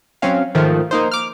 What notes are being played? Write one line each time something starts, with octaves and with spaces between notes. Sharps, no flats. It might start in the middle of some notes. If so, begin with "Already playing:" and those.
F#3 C4 C#4 F5
G#2 D#3 F3 A3
A#3 D#4 C5
D6 F6